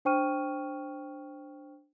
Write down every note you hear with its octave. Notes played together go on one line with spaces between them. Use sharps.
D4 C5 G5 C#6 F6 D#7